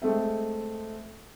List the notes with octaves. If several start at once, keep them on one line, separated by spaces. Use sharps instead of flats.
G#3 A3 C4 E5